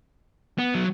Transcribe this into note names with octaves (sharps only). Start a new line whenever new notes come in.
B3
F#3